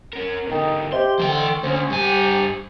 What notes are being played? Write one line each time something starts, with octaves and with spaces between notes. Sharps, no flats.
C#4 A#4
B2 D3 D#4 A#4 G5
G4 C5 D#5 E5 C6
D3 E3 G5
D2 C#4 C5
G2 G4 G#5